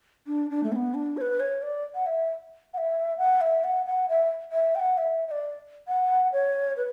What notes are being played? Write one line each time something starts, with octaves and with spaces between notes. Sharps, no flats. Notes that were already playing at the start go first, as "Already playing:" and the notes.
D4
D4
A3
C#4
B3
D4
C#5
B4
C#5
D5
F#5
E5
F#5
E5
F#5
E5
F#5
F#5
E5
E5
G5
F#5
E5
E5
D5
F#5
C#5
B4